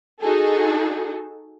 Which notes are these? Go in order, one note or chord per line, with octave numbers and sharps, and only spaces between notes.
D#4 F#4 G#4 A4